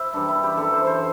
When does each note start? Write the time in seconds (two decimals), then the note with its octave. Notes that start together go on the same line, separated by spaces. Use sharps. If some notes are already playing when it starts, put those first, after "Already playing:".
Already playing: E4 C5
0.13 F#2 E3 G3 D4
0.29 E4
0.43 G4
0.57 F#2 E3 G3 A4
0.73 C5
0.87 C5